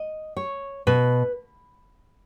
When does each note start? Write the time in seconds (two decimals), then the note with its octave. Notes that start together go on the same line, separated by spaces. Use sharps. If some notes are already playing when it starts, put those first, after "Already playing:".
Already playing: D#5
0.37 C#5
0.87 B2 B4